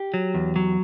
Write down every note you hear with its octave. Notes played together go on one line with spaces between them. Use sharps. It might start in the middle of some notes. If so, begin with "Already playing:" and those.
Already playing: G4
F#3
E2
F#3